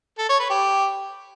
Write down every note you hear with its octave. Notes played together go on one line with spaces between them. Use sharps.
A4
C#5
B4
G4